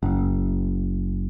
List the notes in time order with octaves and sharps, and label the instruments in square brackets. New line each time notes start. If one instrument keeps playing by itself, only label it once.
[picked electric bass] F#1